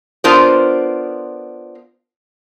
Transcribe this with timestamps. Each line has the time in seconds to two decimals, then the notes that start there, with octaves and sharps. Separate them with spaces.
0.24 B3 D4 F4 A#4 C5